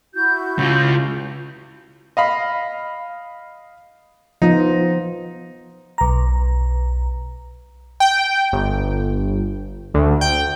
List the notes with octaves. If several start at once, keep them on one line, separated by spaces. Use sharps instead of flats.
E4 F#4 G6
C#3 F4
D#5 F5 B5
F3 B3 D#4 F4
B1 A#5
G5
G1
D2
G5